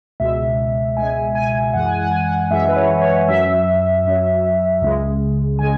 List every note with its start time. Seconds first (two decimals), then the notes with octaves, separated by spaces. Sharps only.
0.20 C#2 B2 G#3 E5
0.97 C#2 B2 G#3 G#5
1.35 G#5
1.74 F#2 E3 G#3 F#5
1.86 G#5
1.99 F#5
2.11 G#5
2.24 F#5
2.51 F#2 E3 G#3 E5
2.69 B4
2.76 C#5
3.02 C#5
3.28 F#2 F#3 E5
4.05 F#2 F#3
4.81 C#2 C#3 G#3
5.59 C#3 G#3 G#5